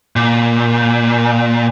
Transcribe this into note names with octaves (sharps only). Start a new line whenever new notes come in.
A#2